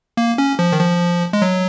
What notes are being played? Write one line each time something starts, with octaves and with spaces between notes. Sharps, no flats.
A#3
C#4
F3
D#3
F3
G#3
F#3